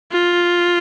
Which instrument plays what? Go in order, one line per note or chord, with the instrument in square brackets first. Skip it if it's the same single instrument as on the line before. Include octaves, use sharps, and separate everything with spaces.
[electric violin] F4